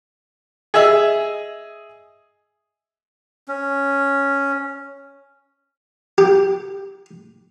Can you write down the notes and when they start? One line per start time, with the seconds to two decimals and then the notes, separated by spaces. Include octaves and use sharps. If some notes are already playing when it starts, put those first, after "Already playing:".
0.74 G#4 D#5 E5
3.48 C#4
6.18 G4